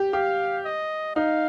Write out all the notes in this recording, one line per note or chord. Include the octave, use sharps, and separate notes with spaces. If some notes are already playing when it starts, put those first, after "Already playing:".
Already playing: G4
G4 F5
D#5
D#4 F5